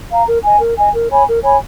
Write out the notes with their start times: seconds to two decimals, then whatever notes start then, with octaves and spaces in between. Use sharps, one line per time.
0.09 F5 A#5
0.27 A#4
0.43 D#5 G#5
0.59 A#4
0.76 D#5 G#5
0.94 A#4
1.10 C#5 G#5 B5
1.27 A#4
1.43 C#5 G#5 B5